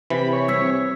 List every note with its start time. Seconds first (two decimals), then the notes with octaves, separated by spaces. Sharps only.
0.10 C3 E3 B5
0.33 C#5
0.48 G3 C4 E6 G#6 B6